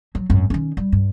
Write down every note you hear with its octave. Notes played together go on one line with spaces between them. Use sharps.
F#3
G#1 F#2
D#3 C#4
G3
G2